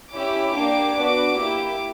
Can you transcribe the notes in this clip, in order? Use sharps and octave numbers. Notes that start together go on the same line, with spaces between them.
C#4 E4 G4 D6
A#3 D4 G4 D6
B3 D4 F#4
A#3 E4 G4